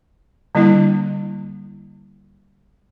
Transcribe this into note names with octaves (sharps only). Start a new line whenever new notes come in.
D3 G3 A#3 D4 E4